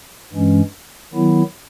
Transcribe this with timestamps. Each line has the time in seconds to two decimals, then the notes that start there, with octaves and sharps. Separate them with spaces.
0.33 G2 E3 G#3 C#4
1.13 D#3 F#3 B3 E4